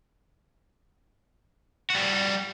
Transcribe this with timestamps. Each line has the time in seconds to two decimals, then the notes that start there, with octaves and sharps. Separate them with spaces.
1.90 G3 F#4